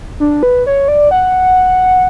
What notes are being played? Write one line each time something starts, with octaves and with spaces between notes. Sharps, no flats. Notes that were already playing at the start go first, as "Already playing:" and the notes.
D4
B4
C#5
D5
F#5